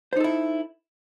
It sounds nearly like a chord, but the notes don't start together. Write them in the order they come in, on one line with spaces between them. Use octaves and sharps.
C5 D#4 A4 E4